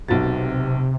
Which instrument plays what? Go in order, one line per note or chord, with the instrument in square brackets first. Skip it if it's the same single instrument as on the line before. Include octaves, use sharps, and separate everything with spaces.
[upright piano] B1 F#4 A6 [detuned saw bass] C3